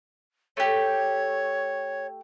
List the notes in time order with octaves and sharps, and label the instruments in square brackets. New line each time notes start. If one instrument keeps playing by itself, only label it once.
[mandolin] A3 G4 [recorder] C#5